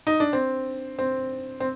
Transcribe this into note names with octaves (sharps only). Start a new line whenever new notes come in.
D#4
D4
C4
C4
C4